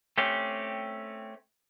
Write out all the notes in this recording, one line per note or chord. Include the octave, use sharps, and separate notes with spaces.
A3 C4 C#4 G4